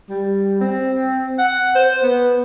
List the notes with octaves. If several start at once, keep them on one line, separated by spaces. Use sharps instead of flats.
G3
C4
F#5
C5
B3